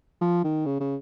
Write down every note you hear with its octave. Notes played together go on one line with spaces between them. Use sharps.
F3
D#3
C#3
C#3